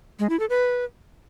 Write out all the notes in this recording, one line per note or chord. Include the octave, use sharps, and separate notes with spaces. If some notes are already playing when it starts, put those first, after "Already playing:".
G#3
E4
A4
B4